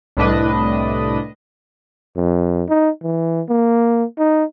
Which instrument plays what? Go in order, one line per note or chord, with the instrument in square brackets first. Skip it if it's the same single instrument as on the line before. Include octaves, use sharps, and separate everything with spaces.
[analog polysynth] C2 A2 D4 B4 D#5
[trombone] F2
D#4
E3
A#3
D#4